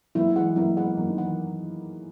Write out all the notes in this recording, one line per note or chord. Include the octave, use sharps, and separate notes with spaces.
F#3 A#3 E4
E3 G#3 F#5
F#3 A#3 E4
G#3 B3 F#5
F#3 A#3 F#5
D#3
E3 F#5